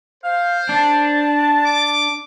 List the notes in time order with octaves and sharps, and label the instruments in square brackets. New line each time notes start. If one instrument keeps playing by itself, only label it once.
[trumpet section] C5 [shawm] F5
[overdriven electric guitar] D4 [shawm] A5
[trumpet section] D6